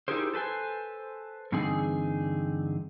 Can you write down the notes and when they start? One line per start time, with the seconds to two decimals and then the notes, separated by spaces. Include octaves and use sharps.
0.08 D#4 E4 G4 G#4 A#4 C5
0.34 A4 B4 C5 G#5
1.52 G2 D3 E3 C4 D#4 G#4